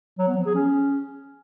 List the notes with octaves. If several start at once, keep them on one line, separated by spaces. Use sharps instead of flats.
F#3
B3
F3
G#4
C#4